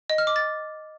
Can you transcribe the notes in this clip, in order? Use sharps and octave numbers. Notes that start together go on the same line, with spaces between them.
D#5
F6
D6
A6